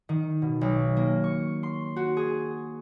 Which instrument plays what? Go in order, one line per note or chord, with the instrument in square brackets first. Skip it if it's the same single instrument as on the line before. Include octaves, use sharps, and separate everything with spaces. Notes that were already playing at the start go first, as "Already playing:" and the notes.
[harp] D#3
B2
B1
A#3
C#6
C6
F#4
G#4